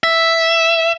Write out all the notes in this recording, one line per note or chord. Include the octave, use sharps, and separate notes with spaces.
E5